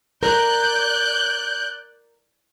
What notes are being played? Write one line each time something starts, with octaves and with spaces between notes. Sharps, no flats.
A#4 D5 F#6 G6